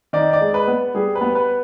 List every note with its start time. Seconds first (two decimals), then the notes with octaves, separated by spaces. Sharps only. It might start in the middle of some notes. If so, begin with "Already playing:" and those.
0.13 D#3 D5
0.33 D5
0.41 G#3
0.54 B4
0.68 B3
0.95 G3 G#4
1.15 B4
1.21 B3
1.35 B4